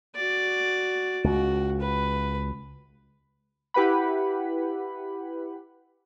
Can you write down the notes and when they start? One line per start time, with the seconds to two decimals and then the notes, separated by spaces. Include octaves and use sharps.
0.15 F#4 D5
1.24 C#2 F#4
1.81 B4
3.74 E4 G4 B4 F#5 B5